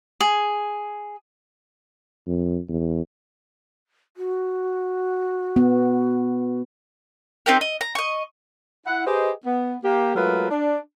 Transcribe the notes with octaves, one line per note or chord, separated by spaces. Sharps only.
G#4
F2
E2
F#4
B3
C4 D#4 G4 A#4
D#5
A#5
D#5 C#6
E4 F#5
G4 G#4 B4 C5 D#5
B3
A#3 G4
F#3 G#3 A3 F4 A#4 B4
D4